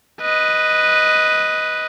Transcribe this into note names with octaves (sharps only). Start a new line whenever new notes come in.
B4 D#5